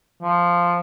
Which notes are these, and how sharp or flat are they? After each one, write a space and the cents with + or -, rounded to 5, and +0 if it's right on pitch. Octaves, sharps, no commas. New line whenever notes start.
F3 -5